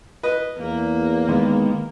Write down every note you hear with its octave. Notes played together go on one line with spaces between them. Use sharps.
B4 D#5
E2 A#3
D#3 G#3 B3